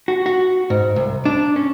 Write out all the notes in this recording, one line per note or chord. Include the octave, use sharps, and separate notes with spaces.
F#4
F#4
G#2
C2
D4
C#4